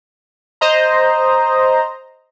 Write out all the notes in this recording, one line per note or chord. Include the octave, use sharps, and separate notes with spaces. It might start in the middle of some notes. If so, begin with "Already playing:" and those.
C5 D#5 A#5